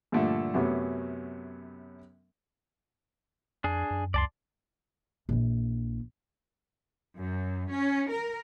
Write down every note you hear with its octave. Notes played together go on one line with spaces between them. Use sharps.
G2 A#2 D3 F3 A3
F#2 C3 F#3 A3 B3 C#4
F2 D4 G#4
F#2
C#2 D5 A5 C6
A#1 E3
F#2
C#4
A#4